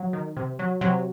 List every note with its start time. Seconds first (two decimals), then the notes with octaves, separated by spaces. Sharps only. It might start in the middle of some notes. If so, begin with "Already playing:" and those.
Already playing: F#3
0.13 D#3
0.37 C3
0.59 F#3
0.81 C3 F#3